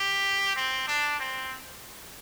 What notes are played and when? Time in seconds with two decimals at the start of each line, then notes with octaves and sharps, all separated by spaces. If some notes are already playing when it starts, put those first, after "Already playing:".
Already playing: G4
0.56 C4
0.88 D4
1.20 C4